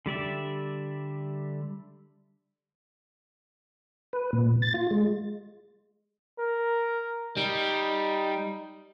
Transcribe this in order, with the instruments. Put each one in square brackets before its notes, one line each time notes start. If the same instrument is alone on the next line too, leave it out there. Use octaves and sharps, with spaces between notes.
[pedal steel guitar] D3 G3 D5 E5
[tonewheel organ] B4
A#2
A6
F4
G#3
[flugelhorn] A#4
[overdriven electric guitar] G3 [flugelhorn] D#4